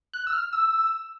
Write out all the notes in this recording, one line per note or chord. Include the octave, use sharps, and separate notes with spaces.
F#6
E6
F6
E6